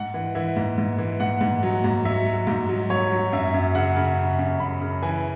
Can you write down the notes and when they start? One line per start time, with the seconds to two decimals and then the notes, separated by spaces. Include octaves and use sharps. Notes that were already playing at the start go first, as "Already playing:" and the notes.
Already playing: G#2 F#5
0.14 E3
0.35 E3 E5
0.56 G#2
0.78 G#2
0.98 E3
1.20 G#2 F#5
1.41 G#2
1.63 F#3
1.84 G#2
2.05 F#3 E5
2.26 F#3
2.47 G#2
2.69 F#3
2.90 F#3 C#5
3.11 F#3
3.32 F#2 E5
3.54 F#2
3.75 C#3 F#5
3.96 C#3
4.18 F#2
4.39 F#2
4.60 F#2 B5
4.81 C#3
5.02 E3 G#5